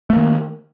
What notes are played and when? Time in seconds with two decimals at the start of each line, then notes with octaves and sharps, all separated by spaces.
0.10 A3
0.13 A#3
0.16 D#3